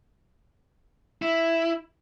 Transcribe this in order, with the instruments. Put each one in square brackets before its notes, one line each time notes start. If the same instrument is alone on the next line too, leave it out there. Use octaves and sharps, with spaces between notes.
[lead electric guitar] E4